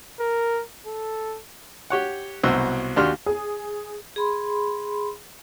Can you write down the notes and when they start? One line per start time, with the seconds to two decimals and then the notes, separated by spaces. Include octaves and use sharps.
0.20 A#4
0.86 A4
1.90 G4 C#5 F#5
2.43 C2 B2 F#3 F#4 C5 E6
2.97 D#2 D4 F#4 G4 C6 F6
3.26 G#4 D#6
4.16 G#4 B5 C6